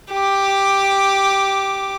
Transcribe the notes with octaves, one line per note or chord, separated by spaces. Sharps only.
G4 D6